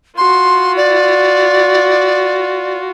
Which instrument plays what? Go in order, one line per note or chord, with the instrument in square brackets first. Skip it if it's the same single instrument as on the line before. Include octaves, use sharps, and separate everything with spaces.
[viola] F4 F#4 [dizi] C6
[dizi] D5